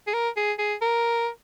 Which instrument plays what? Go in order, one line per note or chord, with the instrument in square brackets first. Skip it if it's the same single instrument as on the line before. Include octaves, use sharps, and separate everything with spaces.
[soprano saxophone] G#4
A#4
G#4
G#4
A#4